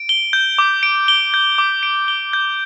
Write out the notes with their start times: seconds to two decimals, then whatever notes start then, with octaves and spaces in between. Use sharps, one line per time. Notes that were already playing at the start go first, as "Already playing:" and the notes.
Already playing: D7
0.09 G7
0.33 G6
0.58 D6
0.83 D7
1.08 G7
1.34 G6
1.58 D6
1.83 D7
2.08 G7
2.33 G6